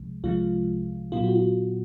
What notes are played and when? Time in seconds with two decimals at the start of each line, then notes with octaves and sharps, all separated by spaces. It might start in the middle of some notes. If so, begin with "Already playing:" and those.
Already playing: C2 C3 F3 G#3
0.23 C2 C3 F3 G#3 F4
1.12 A#2 F#3 B3 F4
1.24 F#4
1.35 F4